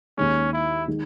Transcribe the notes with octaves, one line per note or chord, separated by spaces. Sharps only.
D#2 D#3 G#3 C#4
E4
D#3 G#3